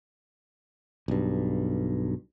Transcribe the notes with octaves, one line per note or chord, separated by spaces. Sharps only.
B1 G2